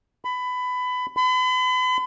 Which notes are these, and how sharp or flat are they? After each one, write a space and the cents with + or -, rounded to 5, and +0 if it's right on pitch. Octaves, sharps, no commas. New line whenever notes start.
B5 +20
B5 +40